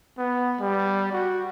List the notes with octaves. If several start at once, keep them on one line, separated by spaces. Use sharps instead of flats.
B3
G3
F#4